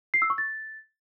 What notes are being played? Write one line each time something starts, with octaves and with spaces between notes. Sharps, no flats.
C7
E6
C#6
A6